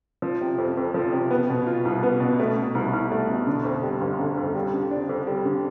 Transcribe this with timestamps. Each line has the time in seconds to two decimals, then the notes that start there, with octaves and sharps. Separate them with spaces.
0.22 F3
0.41 C3
0.58 F2
0.77 F2
0.94 F3
1.12 C3
1.31 B3
1.49 B2
1.67 F4
1.85 C2
2.03 B3
2.20 B2
2.39 A3
2.57 B2
2.75 C2
2.93 C2
3.12 A3
3.29 B2
3.47 D3
3.65 F2
3.83 G3
4.01 G1
4.19 D3
4.37 F2
4.55 G3
4.74 D3
4.91 D4
5.09 F2
5.27 G3
5.45 D3